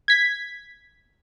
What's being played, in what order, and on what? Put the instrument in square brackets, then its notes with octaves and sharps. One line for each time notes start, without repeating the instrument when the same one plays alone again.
[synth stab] G#6 B6